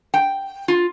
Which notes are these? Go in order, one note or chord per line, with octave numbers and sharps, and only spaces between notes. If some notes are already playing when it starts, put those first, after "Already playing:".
G5
F4